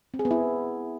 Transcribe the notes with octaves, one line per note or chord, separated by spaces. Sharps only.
C4
G#4
B3
E4